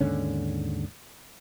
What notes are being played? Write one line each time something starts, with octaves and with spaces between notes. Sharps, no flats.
D#2 G#2 D3 C#4